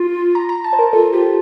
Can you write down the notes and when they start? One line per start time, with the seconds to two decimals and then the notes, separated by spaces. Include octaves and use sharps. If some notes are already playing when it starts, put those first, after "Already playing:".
Already playing: F4
0.35 A#5
0.49 A#5
0.64 A5
0.73 C5
0.79 A#4
0.93 F4 A4
1.13 F4 G4